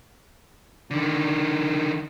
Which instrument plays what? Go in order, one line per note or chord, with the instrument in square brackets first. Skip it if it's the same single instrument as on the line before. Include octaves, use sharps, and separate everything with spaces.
[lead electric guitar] D3 D#3